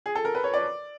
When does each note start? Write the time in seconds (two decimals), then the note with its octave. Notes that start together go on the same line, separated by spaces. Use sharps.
0.06 G#4
0.15 A4
0.25 A#4
0.35 B4
0.44 C#5
0.54 D5